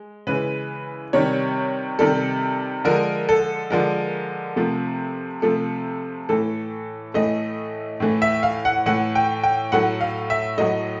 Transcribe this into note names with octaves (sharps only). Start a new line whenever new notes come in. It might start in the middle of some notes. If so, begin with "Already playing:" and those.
Already playing: G#3
C#3 E3 G#3 B4
C3 D#3 G3 C#5
C3 D#3 G3 A4
D3 F3 G#3 A#4
A4
D3 F3 G#3 A#4
C3 F3 A3
C3 F3 A3 A4
A2 E3 A3 A4
A2 E3 A3 D#5
A2 E3 A3
E5
F5
F#5
A2 E3 A3 F#5
G5
G5
A2 F#3 A3 F#5
F5
E5
A2 F#3 A3 D#5